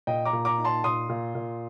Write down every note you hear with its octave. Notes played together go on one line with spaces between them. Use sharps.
A#2 D#5 G5
A#5 D6
A#2
A#5 D6
D#4
A5 C6
A#2 C6 D#6
A#2
A#2